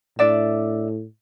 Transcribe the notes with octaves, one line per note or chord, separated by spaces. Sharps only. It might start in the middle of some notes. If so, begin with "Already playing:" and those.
A2 D4 D5 E5